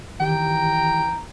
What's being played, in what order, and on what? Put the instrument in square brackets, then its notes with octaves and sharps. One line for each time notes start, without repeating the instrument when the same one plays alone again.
[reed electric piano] D#3 G4 [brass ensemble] E3 A#5 [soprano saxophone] G5